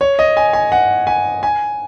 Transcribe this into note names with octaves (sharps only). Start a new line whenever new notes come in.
C#5
D#5
G#5
G#5
F#5
G#5
G#5